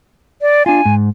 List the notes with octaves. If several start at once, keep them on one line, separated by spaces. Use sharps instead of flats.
D5
D4 F4 G#5
G#2